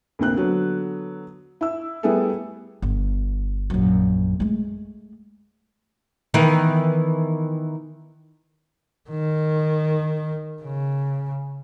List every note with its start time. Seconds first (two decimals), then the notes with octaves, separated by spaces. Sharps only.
0.19 D2 C3 A#3 C4 F#6
0.36 D3 F#3 B3
1.61 E4 E6
2.03 G3 A3 B3 E4 G#4 A4
2.82 G1
3.70 A#1 F#2
4.40 G#3 A3
6.34 D#3 E3 B3
9.10 D#3
10.62 C#3